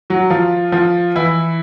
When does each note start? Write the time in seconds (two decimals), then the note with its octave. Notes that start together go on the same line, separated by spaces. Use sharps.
0.10 F#3 F#4
0.30 F3 F4
0.72 F3 F4
1.15 E3 E4